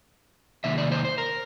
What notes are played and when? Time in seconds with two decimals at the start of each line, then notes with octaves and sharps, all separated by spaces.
0.64 C3 D#3 F#3 A#3 D#4 E5
0.78 D5
0.92 C5
1.05 C5
1.18 A#4